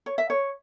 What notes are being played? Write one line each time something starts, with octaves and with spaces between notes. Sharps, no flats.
C#5
E5
C#5